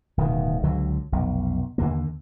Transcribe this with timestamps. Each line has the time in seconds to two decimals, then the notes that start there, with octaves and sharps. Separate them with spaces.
0.18 D1 B2 D#3
0.63 C#2 D3 F#3
1.12 F1 B1
1.78 D#2 D3 A#3